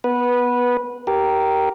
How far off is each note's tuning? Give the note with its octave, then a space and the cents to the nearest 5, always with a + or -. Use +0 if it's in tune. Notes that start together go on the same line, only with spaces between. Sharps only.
B3 -5 B4 -15
G4 -15 A#4 +0